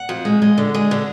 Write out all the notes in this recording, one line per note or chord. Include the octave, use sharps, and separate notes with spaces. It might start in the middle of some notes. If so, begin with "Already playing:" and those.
Already playing: F#5
F2
G#3
G#3
D3
G#3
D3